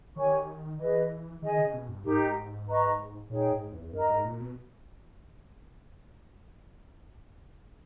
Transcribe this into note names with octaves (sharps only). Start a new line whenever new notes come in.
D#3 G4 C#5 G#5 C#6
E3 G#4 B4 D#5
D#3 G#4 D#5 G#5
C#3
B2
G2
G#2 D#4 G4 A#4
B4 D#5 A#5 C#6
A#2 D#4 G#4 C#5 G5
G#2
E2
G2 A#4 D#5 A#5
G#2
A#2
B2